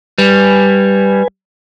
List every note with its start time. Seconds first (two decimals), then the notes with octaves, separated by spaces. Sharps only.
0.18 G3 B4 G#5